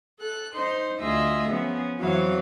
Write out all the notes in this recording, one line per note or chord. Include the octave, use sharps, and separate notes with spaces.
A4 F#6
D#4 C5 C6
D2 F4 G#4 D#5 E5 E6
F3 B3 C#4 G#4
F2 E3 F#3 C4 F5